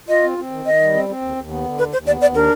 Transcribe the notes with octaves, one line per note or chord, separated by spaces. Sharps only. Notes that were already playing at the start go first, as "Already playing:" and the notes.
F4 D#5
C4
C4
D#3
D#3 D#5
G3
C4
C4
D#2
D#2
B3
D3
D#2 B4
D#2 C5
B3 D5
D#2 D5
D4 A#4